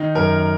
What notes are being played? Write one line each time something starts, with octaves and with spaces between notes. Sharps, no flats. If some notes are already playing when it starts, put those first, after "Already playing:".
Already playing: D#3 D#4
F#2 A#4